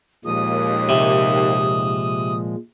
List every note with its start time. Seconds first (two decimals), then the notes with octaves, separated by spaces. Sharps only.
0.25 D#2 A#2 F3 G#3 D#6
0.89 C3